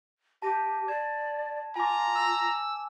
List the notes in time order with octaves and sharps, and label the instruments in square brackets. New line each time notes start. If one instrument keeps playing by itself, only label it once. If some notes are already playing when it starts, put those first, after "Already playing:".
[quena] G4 [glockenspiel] A5 A#6 D#7
[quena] D5 [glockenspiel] G#6 E7
[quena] F4 [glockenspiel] G#5 D6 [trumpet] A#5
[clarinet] E6